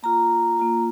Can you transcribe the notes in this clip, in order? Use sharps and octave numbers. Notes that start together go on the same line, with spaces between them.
A#3 F4 A#5
A#3 F4